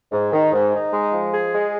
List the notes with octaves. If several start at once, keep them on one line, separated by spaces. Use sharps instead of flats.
G#2
D#3
G#2
D#4
G#3
F3
G#4
G#3